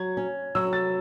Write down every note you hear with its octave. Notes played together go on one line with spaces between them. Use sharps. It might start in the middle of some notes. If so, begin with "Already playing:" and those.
Already playing: F#3 G#6
C#4
F#3 E6
A6